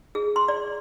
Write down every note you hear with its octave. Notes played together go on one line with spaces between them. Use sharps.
G#4
C6
D5